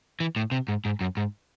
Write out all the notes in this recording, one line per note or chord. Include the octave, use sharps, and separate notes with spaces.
E3
A2
C3
G#2
G#2
F#2
G#2